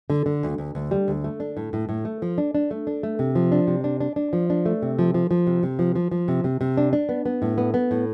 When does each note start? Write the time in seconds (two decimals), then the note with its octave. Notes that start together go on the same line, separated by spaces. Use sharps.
0.10 D3
0.26 D3
0.43 D2
0.58 D2
0.75 D2
0.91 G3
1.08 D2
1.24 A3
1.40 D4
1.57 A2
1.73 A2
1.89 A2
2.05 A3
2.22 F3
2.38 D4
2.55 D4
2.71 A3
2.87 D4
3.03 A3
3.19 C3
3.35 F3
3.52 D4
3.67 C3
3.84 D4
4.00 D4
4.16 D4
4.33 F3
4.50 D4
4.66 A3
4.82 C3
4.99 F3
5.14 F3
5.31 F3
5.47 C3
5.63 C3
5.79 F3
5.95 F3
6.11 F3
6.28 C3
6.44 C3
6.61 C3
6.77 D4
6.93 D4
7.09 B3
7.26 B3
7.42 A2
7.58 B3
7.74 B3
7.91 A2